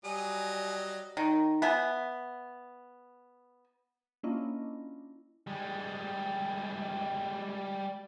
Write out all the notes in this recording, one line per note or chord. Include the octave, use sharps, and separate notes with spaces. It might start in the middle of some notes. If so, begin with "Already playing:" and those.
F#3 G3 D#5 G#5
D#3
B3 E5 G#5
A#3 C#4 D4 E4 F4 D#5
G3 G#3